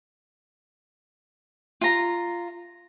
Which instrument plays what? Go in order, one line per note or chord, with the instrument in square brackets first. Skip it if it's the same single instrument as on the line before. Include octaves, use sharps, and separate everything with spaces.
[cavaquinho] F4 A#5